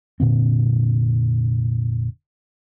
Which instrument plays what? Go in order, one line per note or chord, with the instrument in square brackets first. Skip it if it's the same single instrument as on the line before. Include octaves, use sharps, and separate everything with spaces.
[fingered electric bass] F1 A#2 D3 C4